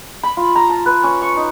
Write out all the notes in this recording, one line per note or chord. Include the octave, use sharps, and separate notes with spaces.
B5
F4
A#5
A5
B4
C#4
C#6
D#4